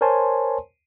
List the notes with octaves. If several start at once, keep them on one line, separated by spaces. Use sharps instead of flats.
A#4 C5 C#5 G#5 A5 C6